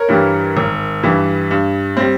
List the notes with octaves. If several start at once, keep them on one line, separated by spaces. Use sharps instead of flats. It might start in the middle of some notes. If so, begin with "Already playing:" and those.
Already playing: A#4 C#5
G2 E3 G3
G#1
G2 E3 G3
G2
G3 C4